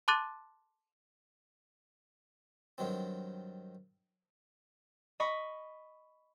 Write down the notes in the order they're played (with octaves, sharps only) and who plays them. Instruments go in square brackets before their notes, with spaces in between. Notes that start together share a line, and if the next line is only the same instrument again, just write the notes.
[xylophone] A5 C6 D6 F#6 A6 D#7
[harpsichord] G2 D#3 F#3 C4
[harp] D#5 B5 C#6